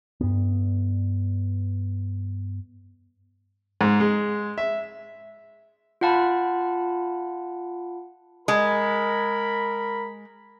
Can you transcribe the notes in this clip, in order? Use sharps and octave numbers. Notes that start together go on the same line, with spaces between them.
G2 B3
G#2
G#3
E5
F4 F5 F#5 A5 B5
G#3 A#4 B5